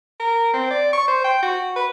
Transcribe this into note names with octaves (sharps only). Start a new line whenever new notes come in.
A#4
C4
D5
C#6
C5
G5
F#4
B4